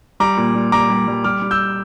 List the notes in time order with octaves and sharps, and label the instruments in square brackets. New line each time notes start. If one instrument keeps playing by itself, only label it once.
[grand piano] G3 A#5 D6
A#2
G3
G3 A#5 D6
G3
G3
G3 D6 F6
G3
E6 G6